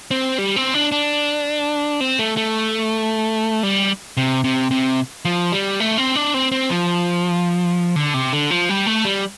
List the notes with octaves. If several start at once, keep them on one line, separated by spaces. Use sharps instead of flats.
C4
G3
C4
D4
D4
C4
A3
A3
G3
C3
C3
C3
F3
G3
A3
C4
D4
C4
C4
F3
D3
C3
D3
F3
G3
A3
G3